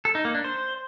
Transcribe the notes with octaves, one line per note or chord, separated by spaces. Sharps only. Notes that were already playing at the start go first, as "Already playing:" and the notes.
A4
D#4
A#3
D4
C5